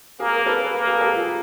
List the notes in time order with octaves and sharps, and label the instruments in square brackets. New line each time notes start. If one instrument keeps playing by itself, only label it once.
[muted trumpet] A#3 [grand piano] G#4 A#4
[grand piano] A#4
A4 B4
[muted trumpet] A#3
[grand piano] G#4 A#4
G4 A4
F4